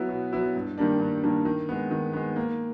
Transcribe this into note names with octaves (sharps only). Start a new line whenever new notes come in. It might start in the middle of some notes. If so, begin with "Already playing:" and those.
Already playing: F#3 B3 E4
B2
F#3 B3 E4
G2
D#3 G3 A#3 D4
G2
D#3 G3 A#3 D4
D#3
G#3 B3
D#3
G#3 B3
A#3